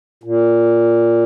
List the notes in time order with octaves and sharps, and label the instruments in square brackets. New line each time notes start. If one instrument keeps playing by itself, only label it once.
[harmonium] A#2